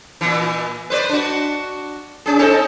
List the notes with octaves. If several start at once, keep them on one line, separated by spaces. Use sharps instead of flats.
A#2 E3
B4 C5 D5
D4 F#4
C#4 G#4
C4 D#4 A4